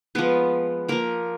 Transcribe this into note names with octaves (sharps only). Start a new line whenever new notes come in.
F3 G#3 B3 B4
F3 A#3 A#4